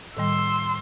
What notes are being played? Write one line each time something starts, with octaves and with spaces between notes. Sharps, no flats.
A2 D#3 G3 C6 E6